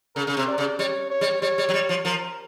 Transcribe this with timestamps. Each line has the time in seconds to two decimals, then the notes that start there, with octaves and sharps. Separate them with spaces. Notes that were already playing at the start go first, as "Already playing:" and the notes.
0.15 C#3 A#4
0.27 C#3
0.37 C3
0.47 D5
0.58 C#3
0.79 G3 C#5
1.10 C#5
1.21 G3
1.42 G3 C#5
1.58 G3
1.69 F#3
1.74 G3
1.89 F3
2.05 F3 A#4